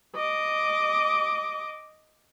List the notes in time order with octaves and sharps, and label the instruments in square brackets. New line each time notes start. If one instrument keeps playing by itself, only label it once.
[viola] D#5 D6